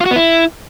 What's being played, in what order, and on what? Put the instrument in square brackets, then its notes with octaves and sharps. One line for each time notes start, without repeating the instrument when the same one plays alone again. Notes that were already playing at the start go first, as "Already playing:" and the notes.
[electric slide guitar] F4
F#4
B3
E4